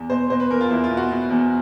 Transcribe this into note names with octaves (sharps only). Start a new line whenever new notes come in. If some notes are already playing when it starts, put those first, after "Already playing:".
Already playing: E2
B2 C5
B2 C5
B4
E2 A#4
F4
E2 E4
F4
B2
F#4
B2
E2